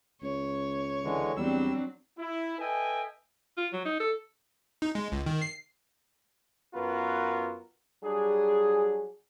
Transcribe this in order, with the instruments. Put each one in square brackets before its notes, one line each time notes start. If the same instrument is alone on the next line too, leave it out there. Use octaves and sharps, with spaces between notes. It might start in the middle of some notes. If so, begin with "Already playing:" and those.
[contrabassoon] C#2 [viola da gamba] C#5
[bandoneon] D3 E3 G#3
[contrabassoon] E2 [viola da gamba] F#3 C4 D4 [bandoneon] G3 E6
[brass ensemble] E4
A4 B4 D#5 E5 G5 G#5
[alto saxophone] F4
F#3
D#4
A4
[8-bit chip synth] D#4
G#3
C#2
D#3
C7
[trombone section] F#2 B3 F4 F#4 A#4 B4
F#3 G3 D4 G#4